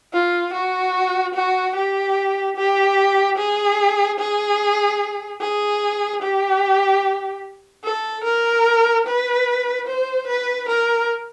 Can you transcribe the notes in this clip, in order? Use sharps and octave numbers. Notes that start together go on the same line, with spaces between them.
F4
F#4
F#4
G4
G4
G#4
G#4
G#4
G4
A4
A#4
B4
C5
B4
A#4